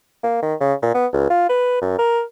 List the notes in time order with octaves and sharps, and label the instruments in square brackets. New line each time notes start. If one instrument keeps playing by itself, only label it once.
[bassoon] A#3
D#3
C#3
A#2
B3
C#2
F4
B4
F#2
A#4